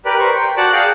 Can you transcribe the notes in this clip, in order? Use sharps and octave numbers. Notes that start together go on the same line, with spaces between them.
G4 A#4 B4 D5
A#4 C5 C#6
G5
F#4 D5 F#5 A5
G#4 F5 G5